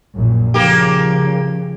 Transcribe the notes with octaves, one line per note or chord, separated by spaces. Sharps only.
A#1 F#2 A#2
C#3 F3 A#3 G4